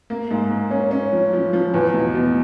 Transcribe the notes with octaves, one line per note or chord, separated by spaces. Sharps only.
A#3
G#2
A#3
C#4
C#4
F3
F3
F3
E2
B2
B2